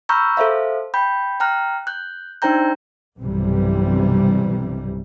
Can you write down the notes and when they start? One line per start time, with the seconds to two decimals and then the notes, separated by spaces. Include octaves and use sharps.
0.09 A#5 B5 C#6 E6 F6 G6
0.37 A4 C5 E5 F5
0.94 G5 B5 G6
1.40 G5 A#5 F6 F#6
1.87 F#6 G6
2.42 D4 D#4 C5 G5 A#5 G6
3.21 B1 G2 C3 E3 G3